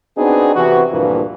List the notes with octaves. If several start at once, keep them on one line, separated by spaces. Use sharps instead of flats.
B3 C4 D4 D#4 F#4 G#4
C3 E3 F#4
D2 G2 A#2 E3 F3 A#3